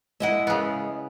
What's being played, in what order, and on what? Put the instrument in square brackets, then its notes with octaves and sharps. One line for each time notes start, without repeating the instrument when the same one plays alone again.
[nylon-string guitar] G#3 D#5 F#5 [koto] E4 E5
[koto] C#3 B3